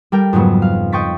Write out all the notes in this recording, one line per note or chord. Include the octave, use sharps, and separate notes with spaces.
G3 A4 A#4 G5
F2 G#2 C#3 F#3 B3
F5
D#5 G5 C6 C#6 A6 B6